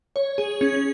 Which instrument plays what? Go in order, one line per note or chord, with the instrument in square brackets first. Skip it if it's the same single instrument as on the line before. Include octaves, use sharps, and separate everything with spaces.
[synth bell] C#5
G#4
C#4